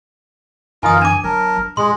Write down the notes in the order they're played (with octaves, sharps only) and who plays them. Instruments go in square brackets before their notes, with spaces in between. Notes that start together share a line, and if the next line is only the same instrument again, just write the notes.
[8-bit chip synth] F#2 D3 E3 [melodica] D#4 F4 A#4 [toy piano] G#5 D#6
[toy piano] D4 D6 [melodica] G#5
[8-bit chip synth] G1 F#3 A5 [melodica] A#4
[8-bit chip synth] A#2 [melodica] G#3 [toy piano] C6